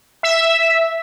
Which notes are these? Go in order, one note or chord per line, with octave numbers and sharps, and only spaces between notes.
E5